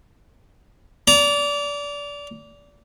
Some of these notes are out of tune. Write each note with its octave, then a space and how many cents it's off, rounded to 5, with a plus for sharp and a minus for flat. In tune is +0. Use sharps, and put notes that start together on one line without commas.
D5 -25 A#5 +0